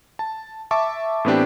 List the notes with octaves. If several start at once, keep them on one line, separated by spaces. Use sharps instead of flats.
A5
E5 A5 C#6 D6
A2 E3 B3 C4 D4 G4